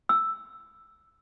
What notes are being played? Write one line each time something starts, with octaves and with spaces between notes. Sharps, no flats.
E6